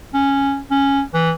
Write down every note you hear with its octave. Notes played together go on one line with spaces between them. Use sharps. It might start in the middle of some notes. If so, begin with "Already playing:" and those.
C#4
C#4
E3